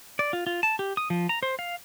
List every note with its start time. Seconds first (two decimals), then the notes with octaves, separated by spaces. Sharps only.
0.19 D5
0.33 F4
0.47 F4
0.63 A5
0.79 G4
0.97 D#6
1.10 F3
1.29 A#5
1.43 C5
1.59 F5